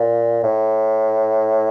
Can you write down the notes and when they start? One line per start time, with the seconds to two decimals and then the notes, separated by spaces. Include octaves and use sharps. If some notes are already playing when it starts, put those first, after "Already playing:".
Already playing: A#2
0.44 A2